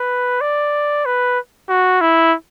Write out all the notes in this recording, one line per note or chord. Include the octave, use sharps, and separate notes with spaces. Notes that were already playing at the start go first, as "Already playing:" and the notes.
Already playing: B4
D5
B4
F#4
E4